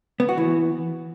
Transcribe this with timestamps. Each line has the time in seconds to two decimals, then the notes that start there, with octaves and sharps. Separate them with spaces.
0.20 B3
0.29 F#4
0.38 E3